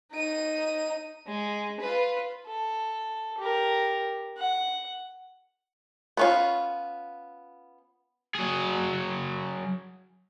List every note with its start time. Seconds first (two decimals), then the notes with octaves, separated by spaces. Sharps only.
0.12 D#4 D#7
1.27 G#3
1.80 F4 B4
2.46 A4
3.38 G4 A#4
4.37 F#5
6.17 B3 C#4 F4
8.35 F#3 G#4